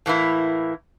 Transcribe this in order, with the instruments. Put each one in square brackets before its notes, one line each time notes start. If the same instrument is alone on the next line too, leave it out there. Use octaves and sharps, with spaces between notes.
[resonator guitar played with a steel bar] A2 E3 A#3 E4